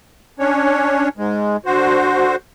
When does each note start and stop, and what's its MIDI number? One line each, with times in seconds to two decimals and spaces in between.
0.39 1.09 61
0.39 1.09 62
0.39 1.09 73
1.17 1.57 44
1.17 1.57 56
1.66 2.36 50
1.66 2.36 66
1.66 2.36 72